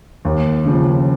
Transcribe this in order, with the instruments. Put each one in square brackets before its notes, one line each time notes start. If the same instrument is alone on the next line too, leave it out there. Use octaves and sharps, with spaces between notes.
[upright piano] D#2
C#3 F3